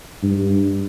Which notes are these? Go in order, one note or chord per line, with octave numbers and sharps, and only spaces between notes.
G2